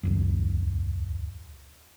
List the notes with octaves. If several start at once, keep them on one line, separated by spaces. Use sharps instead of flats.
D#1 C#2 F#2